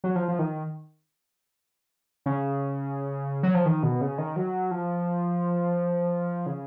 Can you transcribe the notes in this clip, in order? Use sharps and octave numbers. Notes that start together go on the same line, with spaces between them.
F#3
F3
F3
D#3
C#3
F#3
F3
D#3
B2
C#3
D#3
F#3
F3
C#3